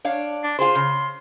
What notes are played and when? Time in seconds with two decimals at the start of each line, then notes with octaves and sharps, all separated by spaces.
0.05 D4 C#5 F5
0.44 D4
0.59 F4 G#4 C5 C6
0.75 C#3